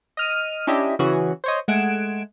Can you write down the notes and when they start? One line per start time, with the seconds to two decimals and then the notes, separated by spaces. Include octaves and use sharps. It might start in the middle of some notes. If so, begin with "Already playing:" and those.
0.17 D#5 F6 D#7
0.67 C#4 D4 E4 G4 D#5 E5
0.99 C#3 E3 C#4 F#4 G#4
1.44 C5 C#5 D#5
1.68 G#3 A3 F#5 G#6 D7 E7